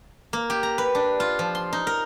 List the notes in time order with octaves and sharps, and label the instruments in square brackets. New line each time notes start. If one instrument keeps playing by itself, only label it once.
[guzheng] A#3
G4
A#5
B4
D4
F4
F3
C6
D#4
A#4